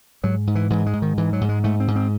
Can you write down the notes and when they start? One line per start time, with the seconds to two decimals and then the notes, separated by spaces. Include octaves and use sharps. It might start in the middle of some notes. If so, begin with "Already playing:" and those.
0.23 G#2 F#3
0.47 G#2
0.55 E3
0.70 G#2 E3
0.86 G#3
0.93 G#2
1.02 D#3
1.17 G#2 E3
1.33 F#3
1.41 G#2
1.49 G#3
1.64 G#2 A3
1.80 C4
1.88 G#2
1.96 C4